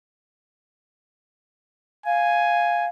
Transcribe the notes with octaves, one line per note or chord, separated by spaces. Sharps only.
F5 G#5